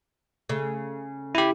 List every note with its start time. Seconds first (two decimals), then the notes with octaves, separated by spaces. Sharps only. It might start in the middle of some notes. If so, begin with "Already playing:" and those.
0.49 C#3 A3
1.35 E4 G4